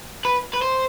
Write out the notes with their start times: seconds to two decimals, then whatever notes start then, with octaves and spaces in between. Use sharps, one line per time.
0.25 B4
0.53 B4
0.62 C5